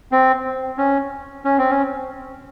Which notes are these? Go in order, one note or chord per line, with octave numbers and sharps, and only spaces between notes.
C4
C#4
C#4
C4
C#4